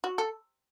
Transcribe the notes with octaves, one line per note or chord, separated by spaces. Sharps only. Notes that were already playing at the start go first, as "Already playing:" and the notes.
F#4
A4